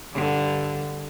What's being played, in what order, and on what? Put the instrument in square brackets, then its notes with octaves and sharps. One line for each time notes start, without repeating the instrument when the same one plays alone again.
[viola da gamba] G2 D3